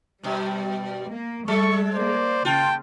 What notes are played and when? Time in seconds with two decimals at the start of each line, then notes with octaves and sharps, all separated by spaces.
0.23 G2 B2 G3
1.10 A#3
1.48 G3 G#3 A4 C#6
1.94 A#3 C5 D5
2.45 C#3 F4 G5 A5